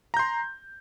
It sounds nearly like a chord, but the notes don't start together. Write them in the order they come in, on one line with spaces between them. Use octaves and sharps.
A#5 G6 C6